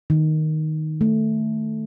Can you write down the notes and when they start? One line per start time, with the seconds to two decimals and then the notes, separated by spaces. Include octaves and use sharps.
0.10 D#3
1.01 A3